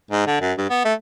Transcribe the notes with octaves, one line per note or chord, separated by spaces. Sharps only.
G#2
D3
F#2
G2
B3
A3